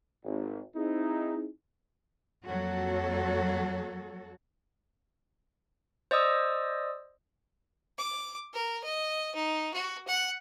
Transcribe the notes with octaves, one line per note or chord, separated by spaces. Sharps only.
G#1
C4 D#4 E4 G#4
F2 F#3 A#3 F#4 A4 C#5
C5 D5 D#5 D#6 E6
D6
A#4
D#5
D#4
F#4
F#5